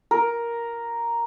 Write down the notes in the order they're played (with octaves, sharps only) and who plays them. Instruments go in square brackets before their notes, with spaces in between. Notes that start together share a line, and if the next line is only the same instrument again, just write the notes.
[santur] A#4